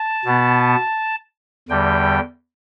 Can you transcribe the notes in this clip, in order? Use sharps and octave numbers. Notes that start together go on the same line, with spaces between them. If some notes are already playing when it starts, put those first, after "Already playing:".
Already playing: A5
B2 B3
E2 D3 G3 G5